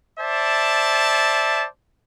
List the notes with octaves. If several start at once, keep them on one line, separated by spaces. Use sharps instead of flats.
C5 D5 E5 A5